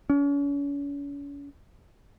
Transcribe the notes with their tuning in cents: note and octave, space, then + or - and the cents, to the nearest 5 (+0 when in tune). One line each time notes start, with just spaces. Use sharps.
C#4 +40